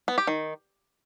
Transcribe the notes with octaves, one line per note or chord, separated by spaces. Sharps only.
B3
G4
D#3